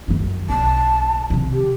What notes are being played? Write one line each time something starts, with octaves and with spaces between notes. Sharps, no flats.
F#2 D#3
B1 A5
C3 D#3
G4